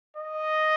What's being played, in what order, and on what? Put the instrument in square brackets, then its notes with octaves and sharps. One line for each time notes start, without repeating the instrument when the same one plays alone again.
[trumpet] D#5